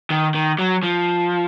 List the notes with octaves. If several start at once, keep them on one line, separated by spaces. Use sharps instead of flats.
D#3
D#3
F#3
F3